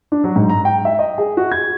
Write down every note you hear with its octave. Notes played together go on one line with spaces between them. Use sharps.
D4
F#3
G#2
A#5
G5
E5
D#5
G#4
F#4
G#6